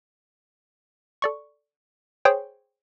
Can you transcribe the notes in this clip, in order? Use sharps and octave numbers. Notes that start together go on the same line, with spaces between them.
A4 D5 C#6
G#4 C5 C#5 G5